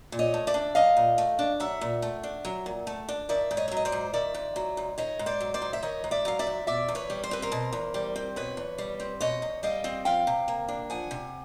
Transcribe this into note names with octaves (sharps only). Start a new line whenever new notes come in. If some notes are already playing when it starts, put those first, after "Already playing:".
A#2
C#5 D#5
A3
D5 E5
D4
F#3 D#5 F5
A#2
A3
D4
F#3 E5 F#5
A#2
A3
D4
F#3
A#2
A3
D4
D#3 D5 E5
G#2
C#5 D#5
E5
F#3
D#5
C5 D5
G#2
D#3 D5 E5
G#2
F#3
G#2
D#3 C#5 D#5
G#2
C5 D5
F#3
C5 D5
G#2
E5
D#3 C#5 D#5
G#2
D5 E5
F#3 F5
D5 E5
G#2
B2 D5 E5
E2
B4 C#5
G3
C5
C4 B4
A#4 C5
B2
E2
G3
C4
B2 B4 C#5
E2
G3
C4
B2 C#5 D#5
E2
G3 D#5 F5
C4
F3 F5 G5
C3
A#3
D4
F3 F#5 G#5
C3